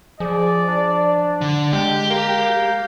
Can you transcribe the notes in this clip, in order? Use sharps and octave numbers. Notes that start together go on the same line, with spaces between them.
F3 G#4 D5
D4
D3
G#3 G4 G6
A#3